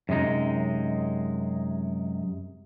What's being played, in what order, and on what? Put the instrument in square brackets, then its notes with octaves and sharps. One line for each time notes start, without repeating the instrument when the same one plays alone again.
[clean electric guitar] F#2 C3 G#3 D#4